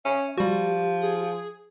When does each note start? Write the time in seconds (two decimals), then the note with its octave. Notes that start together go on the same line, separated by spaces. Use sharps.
0.05 C#4 E5
0.38 F3 G3 F#4 G4
1.01 G#4